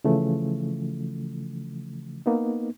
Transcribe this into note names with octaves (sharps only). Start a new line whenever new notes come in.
C#3 E3 F3 A3
A#3 B3 D#4